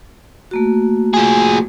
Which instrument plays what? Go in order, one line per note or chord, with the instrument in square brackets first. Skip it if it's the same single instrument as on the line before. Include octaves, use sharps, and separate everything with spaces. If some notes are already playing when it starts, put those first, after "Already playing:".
[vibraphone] A3 A#3 F#4
[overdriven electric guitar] F3 G#4